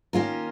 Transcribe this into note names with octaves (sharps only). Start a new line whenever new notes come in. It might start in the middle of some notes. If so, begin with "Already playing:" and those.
D#3 A#3 C#4 F4 A#4